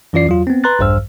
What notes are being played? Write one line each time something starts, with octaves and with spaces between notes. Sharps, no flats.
F#2 E3 C#4 F4 D5 C7
E2 F#3 F4
B3 C4
B4 A#5 C6 F#6 A6
A#1 E2 G2 C5 E6 F6